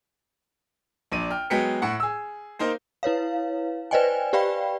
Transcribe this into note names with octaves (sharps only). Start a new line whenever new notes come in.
A#1 D4 D#7
G5 F6
F#3 G#3 B3 G5 B6 C#7
A2 F#5
G#4 E6
A#3 D#4 A#4 C5
E4 B4 C#5 F5
B4 C5 D5 D#5 G5 G#5
G4 B4 D5 F5 G5 B5